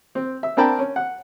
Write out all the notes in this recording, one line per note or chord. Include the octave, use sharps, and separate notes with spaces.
C4
E5
C4 D4 A#4 G5 A5 B5
C#4
F#5